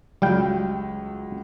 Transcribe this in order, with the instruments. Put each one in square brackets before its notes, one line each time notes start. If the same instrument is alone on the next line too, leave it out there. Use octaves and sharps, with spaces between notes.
[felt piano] C#2 F#3 [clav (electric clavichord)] G3 F5 G5